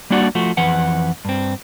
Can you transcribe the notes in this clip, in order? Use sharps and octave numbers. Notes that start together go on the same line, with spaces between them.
G3 A#3 D4 F#4 D5 F#5
F3 A3 F#4
F2 E3 B4 F#5
G2 C4